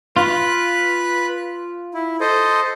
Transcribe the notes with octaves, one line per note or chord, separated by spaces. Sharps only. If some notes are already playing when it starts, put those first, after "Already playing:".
F4 B4 F#6
E4
A4 C5 D#5